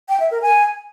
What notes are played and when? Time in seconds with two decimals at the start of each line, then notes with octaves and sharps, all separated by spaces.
0.09 G5
0.20 E5
0.31 A#4
0.42 G#5